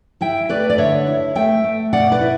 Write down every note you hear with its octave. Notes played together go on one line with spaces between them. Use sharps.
E4 E5 G5
A3 B4 D5
D5
D3 C#5 E5
E4
A3 E5 G5
A3
B2 D5 F#5
B4 D5
E4